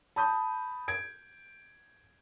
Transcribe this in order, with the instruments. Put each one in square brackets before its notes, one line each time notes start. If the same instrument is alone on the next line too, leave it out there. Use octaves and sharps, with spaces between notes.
[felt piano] A5 B5 D#6 G6
G#6 D7